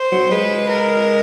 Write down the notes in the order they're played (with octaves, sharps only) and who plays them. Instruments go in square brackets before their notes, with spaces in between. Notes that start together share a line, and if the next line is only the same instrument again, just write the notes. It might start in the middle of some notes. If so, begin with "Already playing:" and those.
Already playing: [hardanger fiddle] C5
[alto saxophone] F#3
[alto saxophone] G#3 [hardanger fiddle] B4
[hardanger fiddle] A#4